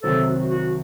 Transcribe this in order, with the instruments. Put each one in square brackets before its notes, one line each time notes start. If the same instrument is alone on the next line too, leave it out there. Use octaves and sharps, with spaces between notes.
[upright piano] C2 C3 D#3 F#3 C4 [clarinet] A4
[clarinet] F#4
F#4